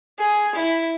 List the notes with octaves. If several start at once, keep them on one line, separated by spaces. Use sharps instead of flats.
G#4
E4